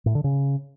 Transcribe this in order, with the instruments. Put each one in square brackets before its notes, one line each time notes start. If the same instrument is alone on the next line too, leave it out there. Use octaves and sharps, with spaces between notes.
[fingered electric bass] A2
D3
C#3